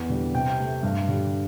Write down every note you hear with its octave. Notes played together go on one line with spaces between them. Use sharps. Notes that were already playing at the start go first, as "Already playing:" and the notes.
Already playing: E2
D3 G3
C3 G5
A3
G2
D3 G3